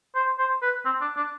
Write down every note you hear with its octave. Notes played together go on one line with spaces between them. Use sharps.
C5
C5
B4
C4
D4
D4